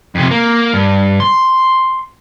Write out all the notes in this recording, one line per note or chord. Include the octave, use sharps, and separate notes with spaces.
F2 C3
A#3
G2
C6